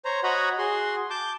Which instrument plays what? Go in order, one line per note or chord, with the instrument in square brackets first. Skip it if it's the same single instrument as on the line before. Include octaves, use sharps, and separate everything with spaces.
[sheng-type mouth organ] C5 C#5 A#5
F#4 C#5 D#5 F#5 A#5 B5
F#4 G#4 C6
A5 D6 G6